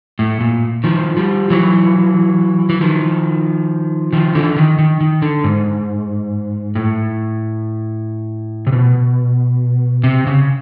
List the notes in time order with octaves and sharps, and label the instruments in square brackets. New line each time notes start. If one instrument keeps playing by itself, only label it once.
[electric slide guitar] A2
A#2
D#3 F3
F3 G3
E3 F#3
E3
D#3 F3
D#3 F3
D3 E3
D#3
D#3
D#3
D3
G#2
A2
C3
B2
C3
C#3